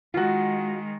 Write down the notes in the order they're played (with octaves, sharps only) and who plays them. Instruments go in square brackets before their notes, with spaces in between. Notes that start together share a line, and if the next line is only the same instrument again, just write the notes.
[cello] D#3 G#3 [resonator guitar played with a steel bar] F4 F#4